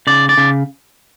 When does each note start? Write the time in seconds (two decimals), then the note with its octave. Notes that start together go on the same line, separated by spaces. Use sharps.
0.07 C#3 D5
0.29 D5
0.38 C#3